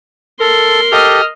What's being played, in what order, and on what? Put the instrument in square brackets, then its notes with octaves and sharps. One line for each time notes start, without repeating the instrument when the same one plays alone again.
[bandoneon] A4 [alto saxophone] A#4 [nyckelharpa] C6
[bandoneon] G4 A4 [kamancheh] D#5 F6